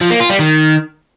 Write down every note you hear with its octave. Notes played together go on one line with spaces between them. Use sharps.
F3
A#3
F4
G3
D#3